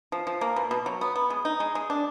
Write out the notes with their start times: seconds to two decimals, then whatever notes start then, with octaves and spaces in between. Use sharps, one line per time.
0.12 F3
0.27 F3
0.41 A#3
0.56 B2
0.71 B2
0.86 F#3
1.01 B3
1.16 B3
1.30 G#3
1.45 D#4
1.60 G#3
1.75 G#3
1.90 D4